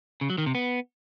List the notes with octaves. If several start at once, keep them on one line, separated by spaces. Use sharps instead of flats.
C#3
F#3
D#3
C3
B3